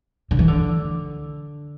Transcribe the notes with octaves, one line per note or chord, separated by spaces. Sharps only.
D3
E3
D3